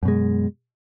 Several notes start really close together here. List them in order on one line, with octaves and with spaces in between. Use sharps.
F#2 B2 G#3